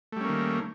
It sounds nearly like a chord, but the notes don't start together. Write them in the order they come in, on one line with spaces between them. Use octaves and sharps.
A3 G3 C#4 A#3 D#3